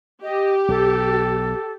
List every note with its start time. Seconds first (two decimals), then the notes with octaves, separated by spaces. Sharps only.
0.22 G4 D#5
0.68 B1 A4